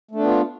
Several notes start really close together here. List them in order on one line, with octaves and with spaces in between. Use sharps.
A3 D4 B3 F4